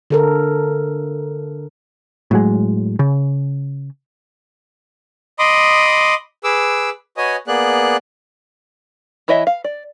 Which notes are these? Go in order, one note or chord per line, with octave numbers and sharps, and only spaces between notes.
D3 A4 A#4
A2 F#3 G#3
C#3
D#5 B5 C6 D6 D#6
G#4 B4 D6 E6
F#4 B4 C#5 D#5 G#5 D#6
A#3 B3 G#4 D5 F#6
E3 E4 C#5 D#5 E5
F5
D5